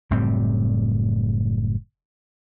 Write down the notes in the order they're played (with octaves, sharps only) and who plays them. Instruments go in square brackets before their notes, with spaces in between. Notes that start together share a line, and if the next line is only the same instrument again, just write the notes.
[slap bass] F#1 A2 G3 C4